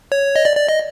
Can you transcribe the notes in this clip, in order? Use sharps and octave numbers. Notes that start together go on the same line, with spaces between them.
C#5
D#5
D5
D5
D#5